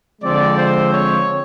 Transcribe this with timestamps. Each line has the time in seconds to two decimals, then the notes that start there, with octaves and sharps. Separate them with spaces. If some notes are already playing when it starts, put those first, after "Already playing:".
0.21 D3 F3 G#3 C4 D5
0.57 C5
0.91 C#5